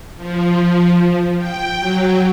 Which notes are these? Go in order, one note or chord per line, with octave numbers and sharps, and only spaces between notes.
F3
G5
F#3